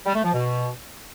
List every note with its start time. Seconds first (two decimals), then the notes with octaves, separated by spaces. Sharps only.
0.06 G3
0.15 A3
0.24 F3
0.34 B2